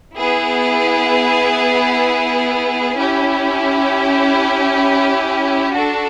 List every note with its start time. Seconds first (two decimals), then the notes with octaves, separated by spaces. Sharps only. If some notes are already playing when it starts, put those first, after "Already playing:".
0.17 B3 E4 G#4
2.95 C#4 E4 G4
5.73 D4 F#4 A4